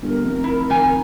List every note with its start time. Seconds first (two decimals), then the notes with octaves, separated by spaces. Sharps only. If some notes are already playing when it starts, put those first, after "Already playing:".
0.02 G1 A#4
0.23 F1
0.44 E4
0.70 F1 D#3 G#5 A#5